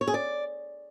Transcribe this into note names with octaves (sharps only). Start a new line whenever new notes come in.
C#5
G#4
D5